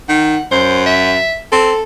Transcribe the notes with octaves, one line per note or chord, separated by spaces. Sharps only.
D#3 F#5
F#2 C5
E5
C4 A4